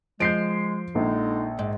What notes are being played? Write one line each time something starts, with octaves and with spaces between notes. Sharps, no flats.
F3 G#3 G6 C7 D7
A#1 D3 G#3 D#4
G#2